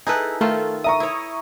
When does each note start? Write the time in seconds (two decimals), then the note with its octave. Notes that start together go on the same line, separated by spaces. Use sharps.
0.07 D#4 E4 G#4 A4 B4
0.41 D#3 A3 F4 A4
0.84 E5 A#5 C#6 D#6
1.00 E4 C#5